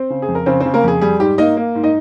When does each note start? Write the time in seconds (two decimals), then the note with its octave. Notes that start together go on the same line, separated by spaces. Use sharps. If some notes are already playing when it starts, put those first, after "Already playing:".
Already playing: C4 C5
0.10 C#3
0.22 G#4
0.28 F2
0.35 A#4
0.46 C#3 C4 C5
0.60 C4 C5
0.66 C#3
0.74 A#3 A#4
0.84 F2 G#4
1.01 G3 G#4
1.20 G#2 G4
1.38 A#3 D#4 D#5
1.57 A#3
1.75 G#2
1.83 D#4 D#5